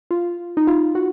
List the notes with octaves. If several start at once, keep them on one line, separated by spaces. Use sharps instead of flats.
F4
D#4
F4
F#4